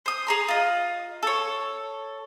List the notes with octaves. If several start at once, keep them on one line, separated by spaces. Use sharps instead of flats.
C5 D#6
G#4 A#5 C6
F4 D#5
A4 C#5